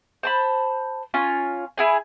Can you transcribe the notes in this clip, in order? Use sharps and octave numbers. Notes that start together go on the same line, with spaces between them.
C5 A5 B5
C#4 F4 G#5
E4 G#4 G#5